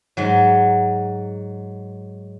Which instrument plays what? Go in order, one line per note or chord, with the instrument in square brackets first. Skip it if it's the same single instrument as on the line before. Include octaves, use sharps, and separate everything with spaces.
[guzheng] G#2 F#3